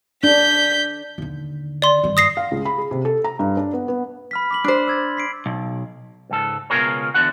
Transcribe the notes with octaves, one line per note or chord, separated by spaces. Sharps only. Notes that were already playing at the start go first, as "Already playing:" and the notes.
D4 G6 B6
D#2 D3
D5 C6
G2 D#3
D#6 A#6 C7
F5
C#2
B5
G#4
C3
A4
A#5
G2
D4
B3
B3
B5 F6 B6
D6 B6 F#7
D4 C5
E6 G#6 A6
B6 C7 D7
B1
C#2 G#2 A4
C#2 B2 F4 G#4 A#4 C#5
E2 D3 F#4 F#5